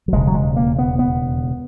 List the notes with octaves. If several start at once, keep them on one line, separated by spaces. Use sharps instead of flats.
F#3
E1 D#2 C#3 G#3
F#3
G#3
A#3
B3
B3